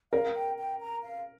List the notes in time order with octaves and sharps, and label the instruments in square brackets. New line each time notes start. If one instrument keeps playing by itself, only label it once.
[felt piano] A#4 [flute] F5
[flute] G5
G5
A#5
F5